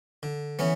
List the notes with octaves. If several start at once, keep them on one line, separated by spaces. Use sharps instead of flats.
D3
E3 B3 C#4